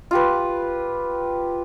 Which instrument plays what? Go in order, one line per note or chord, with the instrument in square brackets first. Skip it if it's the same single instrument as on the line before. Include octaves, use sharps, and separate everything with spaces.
[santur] F4 G4 B4